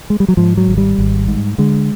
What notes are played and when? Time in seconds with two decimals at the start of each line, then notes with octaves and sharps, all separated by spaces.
0.10 G#3
0.20 G3
0.28 F#3
0.37 G#2 F3
0.57 F#3
0.68 G#1
0.78 G3
0.98 G#1
1.28 G#2
1.58 D3 G#3